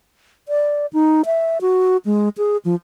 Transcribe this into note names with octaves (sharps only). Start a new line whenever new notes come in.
D5
D#4
E5
F#4
G#3
G#4
F3